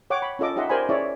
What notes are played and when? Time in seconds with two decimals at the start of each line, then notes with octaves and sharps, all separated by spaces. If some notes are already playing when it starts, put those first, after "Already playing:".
0.10 C#5 F#5 G5 D6
0.22 B5
0.39 C#4 F4 A4 D#5 D6
0.56 D#4 G4 D#5 E5 F#5 C6
0.69 G4 A#4 C5 D5 G#5 B5
0.89 C#4 E4 G#4 C#5 D5 E5